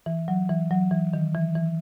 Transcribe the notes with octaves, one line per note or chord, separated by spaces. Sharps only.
E3
F#3
E3
F#3
E3
D#3
E3
E3